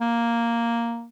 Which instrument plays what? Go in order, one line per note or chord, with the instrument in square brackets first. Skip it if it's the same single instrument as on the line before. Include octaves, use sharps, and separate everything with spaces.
[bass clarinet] A#3